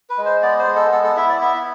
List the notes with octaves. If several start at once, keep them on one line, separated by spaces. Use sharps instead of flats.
B4
G#3
C5
B3 D5
C5
G#3
A4
B3 A4
A4
E4 E5
D5
B3 E5